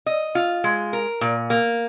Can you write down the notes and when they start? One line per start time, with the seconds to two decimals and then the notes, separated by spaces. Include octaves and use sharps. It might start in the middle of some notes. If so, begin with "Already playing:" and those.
0.06 D#5
0.35 F4
0.64 G#3
0.93 A#4
1.21 A#2
1.50 A#3